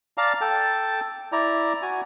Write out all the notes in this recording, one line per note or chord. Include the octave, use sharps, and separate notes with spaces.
D5 F5 A5 A#5
A4 G5 A5
E4 D5 A#5
F#4 G#5